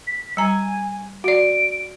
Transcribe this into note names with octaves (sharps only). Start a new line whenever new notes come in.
B6
G3 G#5 A#5
F#4 D5 D7